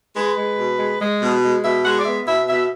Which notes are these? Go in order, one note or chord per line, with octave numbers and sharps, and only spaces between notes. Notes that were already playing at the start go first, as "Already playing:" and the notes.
G#3 B4
G#3
B2
G#3
G#3
B2
G#3
B2 E5
G#3 F#5
D5
B3 E5
B2 E5
B2 E5